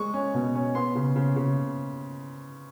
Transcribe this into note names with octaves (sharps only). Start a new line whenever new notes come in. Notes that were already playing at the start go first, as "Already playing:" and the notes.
Already playing: G#3 C#6
C#4
B2
C#4
B3 C6
C#3
C#3
C#3